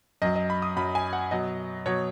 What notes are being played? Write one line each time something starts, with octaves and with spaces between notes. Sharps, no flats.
F#2 F#3 D#5
D#5
B5
D#6
F#2 F#3 B5
G#5
F#5
B2 F#3 D#5
B2 F#3 C#5